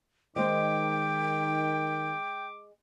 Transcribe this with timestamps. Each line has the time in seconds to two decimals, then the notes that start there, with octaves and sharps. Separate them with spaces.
0.36 D#3 G#3 C5 D#5 G5 D6